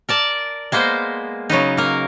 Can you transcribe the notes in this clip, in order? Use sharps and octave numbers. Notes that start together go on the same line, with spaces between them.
A#4 D5 A5
G#3 A#3 B3 C5
C#3 F#3 B3 D#4
A#3 A#4